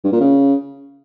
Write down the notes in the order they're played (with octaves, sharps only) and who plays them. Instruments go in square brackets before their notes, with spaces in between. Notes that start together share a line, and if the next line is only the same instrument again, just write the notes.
[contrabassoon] G2
A#2
C#3